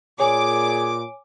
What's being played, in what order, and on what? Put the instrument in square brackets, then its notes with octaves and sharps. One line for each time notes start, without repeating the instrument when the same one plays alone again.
[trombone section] A#2 [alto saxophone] G#4 [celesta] C#5 G#5 [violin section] D6